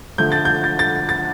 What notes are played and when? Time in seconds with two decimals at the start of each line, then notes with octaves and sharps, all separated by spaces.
0.18 D3 F3 A3 G6
0.32 A6
0.45 G6
0.64 A6
0.79 A6
1.09 A6